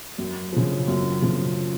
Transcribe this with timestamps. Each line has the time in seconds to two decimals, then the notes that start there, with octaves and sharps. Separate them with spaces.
0.18 F#2
0.53 C#3 F3
0.88 F#2
1.22 C#3 F3